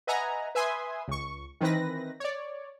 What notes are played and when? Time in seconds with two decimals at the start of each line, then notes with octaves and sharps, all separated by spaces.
0.07 B4 D#5 E5 F#5 G#5 A#5
0.55 B4 E5 G#5 C6 D#6
1.08 C#2 C#6
1.60 D#3 E3 C4 B4 A#6
2.20 C#5 D5